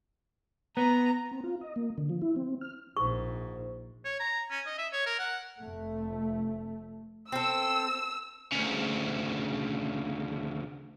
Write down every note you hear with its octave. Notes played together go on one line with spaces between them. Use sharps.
B3 A#5
C4
F4
D#5
A#3
D3
F3
E4
C4
F6
A#1 G#2 C#6
C#5
A#5
C#4
D#5
E5
C#5
A#4
F#5
F1 A3
C4 A4 E6
D2 C#3